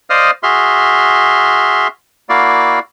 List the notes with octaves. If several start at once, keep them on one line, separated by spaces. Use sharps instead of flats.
C5 D5 D#5 F5 D#6 F6
F#4 G#4 E5 C6 F6
A#3 E4 F#4 D5 F5